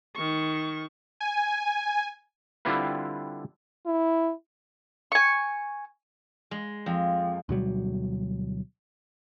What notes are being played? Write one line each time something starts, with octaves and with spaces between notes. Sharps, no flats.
D#3 C#6
G#5
D3 G3 C4 E4 F4 B4
E4
G#5 C#6
G#3
F2
D2 B2 F#3 G3